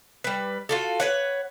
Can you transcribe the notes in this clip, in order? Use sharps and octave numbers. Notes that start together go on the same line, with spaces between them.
G3 B4
F4 F#4 A4
B4 C#5 F#5